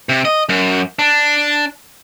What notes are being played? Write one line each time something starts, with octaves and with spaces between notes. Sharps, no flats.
C3
D#5
F#2
D4